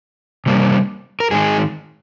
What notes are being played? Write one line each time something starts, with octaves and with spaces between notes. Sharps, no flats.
C3 G3 A#3
A#4
G#2 D#3 G#3 G#4